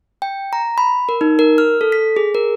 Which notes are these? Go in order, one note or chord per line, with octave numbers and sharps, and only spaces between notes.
G5
A#5
B5
A#4
D#4
A#4
F6
A4
B6
G#4
A#4